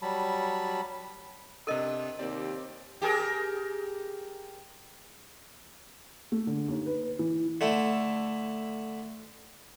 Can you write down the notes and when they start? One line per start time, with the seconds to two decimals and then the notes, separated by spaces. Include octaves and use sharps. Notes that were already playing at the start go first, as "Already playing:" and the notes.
0.02 F#3 G3 A5 B5
1.67 C3 D4 A4 A#4 D#5
2.19 D#2 C4 G4 D5
3.02 G4 G#4 A#4
6.32 A3
6.47 D3
6.68 D#2
6.86 B4
7.19 E3
7.61 D3 A3 E4